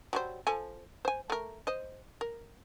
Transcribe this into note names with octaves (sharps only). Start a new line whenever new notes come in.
F#3 G3 C5
F3 A4 G#5
C5 G#5
A3 A#4
C5 D#5
A#4